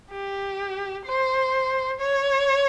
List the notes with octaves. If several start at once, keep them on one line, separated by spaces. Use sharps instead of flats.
G4
C5
C#5